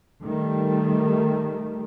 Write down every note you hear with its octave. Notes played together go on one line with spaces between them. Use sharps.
D#3 G3 A3